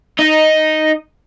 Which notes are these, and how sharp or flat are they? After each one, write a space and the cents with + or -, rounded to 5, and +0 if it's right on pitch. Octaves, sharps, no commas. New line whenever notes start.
D#4 +0 D#5 +0